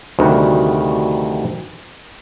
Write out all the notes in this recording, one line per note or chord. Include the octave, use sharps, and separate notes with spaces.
D2 C3 D#3 G3 F#4